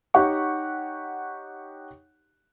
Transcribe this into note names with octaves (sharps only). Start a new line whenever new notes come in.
D#4 G4 C#5 F#5 C#6